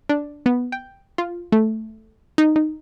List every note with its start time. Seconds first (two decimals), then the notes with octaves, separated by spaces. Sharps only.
0.09 D4
0.46 B3
0.72 G5
1.18 F4
1.52 A3
2.38 D#4
2.56 D#4